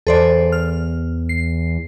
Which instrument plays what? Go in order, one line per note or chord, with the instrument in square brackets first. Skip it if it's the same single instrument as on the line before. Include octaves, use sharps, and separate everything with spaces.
[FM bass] E2 [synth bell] A4 C5 D5
[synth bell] F6
C7